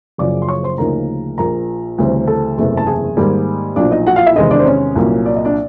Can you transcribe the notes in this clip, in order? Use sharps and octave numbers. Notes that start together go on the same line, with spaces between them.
F#1 F#2 C#3 F3 D5 D6
C6
C#5 C#6
C5 C6
D2 C#3 F3 A#3 D#4 A#4 A#5
A#1 A#2 F3 A#3 A#4 A#5
D2 C#3 E3 G3 C4
A4 A5
F#1 E2 C3 E3 A3
A5
G#4 G#5
G#2 D#3 G3 A#3
B1 A#2 F3 D4 D5
D#4 D#5
F#4 F#5
F4 F5
E4 E5
E2 C3 D#3 G#3 D#4 D#5
D4 D5
C5
C#4 C#5
C2 A#2 F#3 A#3
D5
D#5
D4 D5